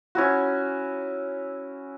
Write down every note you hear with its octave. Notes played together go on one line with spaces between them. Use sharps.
C#4 E4 F#4